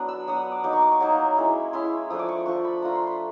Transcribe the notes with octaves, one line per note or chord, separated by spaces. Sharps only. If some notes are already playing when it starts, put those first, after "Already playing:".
Already playing: F#3 B3 D4
E6
F#3 B3 D4 D#6
D6
F#3 A#3 D#4 D6
C#6
D6
C#6
F#3 A#3 D#4
G#3 C#4 E4
G#3 C#4 E4 C6
F3 A3 D4 D#6
D6
C#6
F3 A3 D4 C#6
B5
A3 D4 F4 A#5
C6
B5